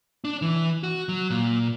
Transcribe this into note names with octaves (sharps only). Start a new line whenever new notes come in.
D4
E3
F#4
F#3
A#2